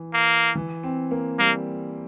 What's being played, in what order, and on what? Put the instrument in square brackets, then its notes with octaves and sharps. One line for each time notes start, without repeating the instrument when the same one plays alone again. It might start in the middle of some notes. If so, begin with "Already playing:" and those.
Already playing: [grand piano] E3
[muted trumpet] A#3
[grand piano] E3
C4
A#3
[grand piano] G3 [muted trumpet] A#3